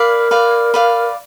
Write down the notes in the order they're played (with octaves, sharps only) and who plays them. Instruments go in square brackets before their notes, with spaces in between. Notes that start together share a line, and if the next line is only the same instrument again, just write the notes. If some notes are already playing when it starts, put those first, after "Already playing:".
Already playing: [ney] A#4 [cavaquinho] B4 D5 F5
[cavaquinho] B4 D5 F5
B4 D5 F5